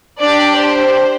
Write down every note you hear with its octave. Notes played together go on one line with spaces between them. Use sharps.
D4 G4 D5
C5